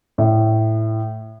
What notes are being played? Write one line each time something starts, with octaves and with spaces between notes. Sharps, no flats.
A2